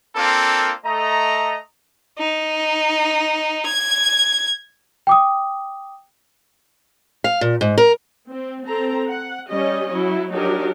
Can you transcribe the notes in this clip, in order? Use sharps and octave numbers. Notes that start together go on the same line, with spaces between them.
A#3 C4 D4 F4 A4 A#4
A3 D#5 A#5
D#4
G#6
G5 D6 D#6
F5
A#2
G#2
A#4
C4
C4 A4 A#5
F#5
G3 C#4 G4 C#5 D#5
F#3 E4
F#3 D4 D#4 G4 A#4